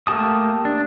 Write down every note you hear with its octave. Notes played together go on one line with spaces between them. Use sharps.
A3 A#3 G4 A5 D#6
D4